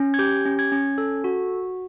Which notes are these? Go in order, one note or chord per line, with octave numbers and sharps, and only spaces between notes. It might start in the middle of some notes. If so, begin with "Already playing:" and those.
Already playing: C#4
G#6
G4 G6
C#4
G#6
C#4
A4
F#4